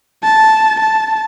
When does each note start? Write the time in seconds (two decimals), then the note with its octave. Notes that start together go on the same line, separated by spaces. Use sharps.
0.24 A5
0.79 A5